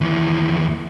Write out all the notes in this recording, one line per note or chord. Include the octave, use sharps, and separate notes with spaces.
D#2 E3